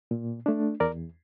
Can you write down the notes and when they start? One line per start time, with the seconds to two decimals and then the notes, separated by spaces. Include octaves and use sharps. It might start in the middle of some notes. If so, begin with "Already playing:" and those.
0.11 A#2
0.46 A3 D4
0.80 E2 A#4 D5